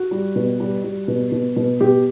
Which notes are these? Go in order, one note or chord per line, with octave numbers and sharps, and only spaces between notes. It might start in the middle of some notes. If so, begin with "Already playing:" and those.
Already playing: F#4
G3
B2
G3
G3
B2
B2
B2
B2 G4